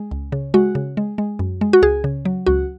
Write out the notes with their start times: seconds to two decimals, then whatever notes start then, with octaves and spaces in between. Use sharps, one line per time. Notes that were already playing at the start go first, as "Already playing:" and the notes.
Already playing: G#3
0.11 C#2
0.32 C#3
0.54 G#3 F#4
0.75 C#3
0.97 G#3
1.18 G#3
1.39 F#2
1.61 G#3
1.73 F#4
1.82 C#2 G#4
2.04 C#3
2.25 F#3
2.46 C#2 F#4